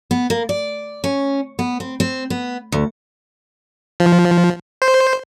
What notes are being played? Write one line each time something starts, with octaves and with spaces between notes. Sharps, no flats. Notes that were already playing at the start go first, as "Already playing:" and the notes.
B3
A#3
D5
C#4
B3
C4
C4
B3
D2
F3
C5